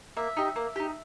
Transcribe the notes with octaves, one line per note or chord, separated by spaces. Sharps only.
A#3 E5
D#4 G4
A#3
D#4 G4